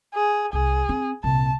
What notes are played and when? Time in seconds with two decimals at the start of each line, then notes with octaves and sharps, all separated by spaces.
0.14 G#4
0.53 C2 G#4
0.89 C4
1.24 C2 A#2 A5